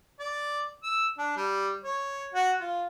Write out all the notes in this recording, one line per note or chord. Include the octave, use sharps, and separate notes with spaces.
D5
E6
D4
G3
C#5
F#4
F4